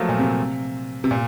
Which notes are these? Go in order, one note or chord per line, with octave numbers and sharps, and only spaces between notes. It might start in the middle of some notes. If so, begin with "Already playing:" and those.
Already playing: F3 F#3 A3 A#3
A#2
C3
C3
A#2